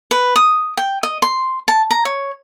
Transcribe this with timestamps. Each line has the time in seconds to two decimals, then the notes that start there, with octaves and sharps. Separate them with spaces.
0.11 B4
0.36 D#6
0.77 G5
1.03 D#5
1.22 C6
1.68 A5
1.91 A#5
2.05 C#5